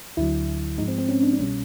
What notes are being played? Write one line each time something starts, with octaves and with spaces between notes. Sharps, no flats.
D2 D3 F#3 E4
G#2 F3 G#3 D#4
C4
C4
C#4
D4
D4
C2 B2 G3 C#4